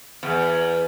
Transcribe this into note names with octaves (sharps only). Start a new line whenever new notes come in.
E2